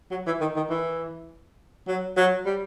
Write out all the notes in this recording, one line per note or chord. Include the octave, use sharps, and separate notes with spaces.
F#3
E3
D#3
D#3
E3
F#3
F#3
G3